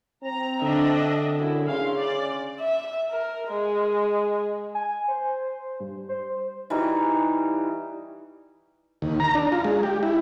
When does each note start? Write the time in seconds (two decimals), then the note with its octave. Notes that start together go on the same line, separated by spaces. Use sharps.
0.23 C4 A#5
0.62 D3 D4 D#5 E5
1.39 F#2 E4
1.67 C#3 F5 C6
1.96 D5
2.60 E5
3.12 A#4
3.48 G#3
4.75 G#5
5.08 C5
5.80 G2
6.09 C5
6.70 E3 G3 D#4 F#4
9.02 D#2
9.20 A#5
9.35 D4
9.52 F4
9.64 G#3
9.83 G4
10.03 E4